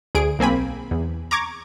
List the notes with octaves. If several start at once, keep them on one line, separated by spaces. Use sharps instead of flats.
D2 G#4 D7
B1 A#3 C4 G#5 B5
E2
A#5 C#6 D6 G#6